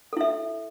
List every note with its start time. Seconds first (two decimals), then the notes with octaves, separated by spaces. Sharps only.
0.13 A4
0.17 E4
0.21 E5